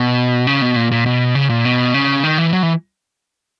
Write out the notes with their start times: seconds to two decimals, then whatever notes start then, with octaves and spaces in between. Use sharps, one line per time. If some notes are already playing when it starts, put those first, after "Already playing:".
Already playing: B2
0.47 C#3
0.62 B2
0.76 A#2
0.91 A#2
1.06 B2
1.35 C#3
1.50 A#2
1.65 B2
1.94 C#3
2.24 D#3
2.38 E3
2.53 F#3
2.63 E3